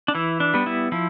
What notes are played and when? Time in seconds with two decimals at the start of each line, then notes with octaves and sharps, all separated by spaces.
0.08 D4
0.15 E3 E4
0.40 D4
0.54 G3 B3
0.66 E4
0.92 F3 E4